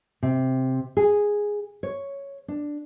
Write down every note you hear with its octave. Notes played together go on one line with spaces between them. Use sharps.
C3
G#4
C#5
D4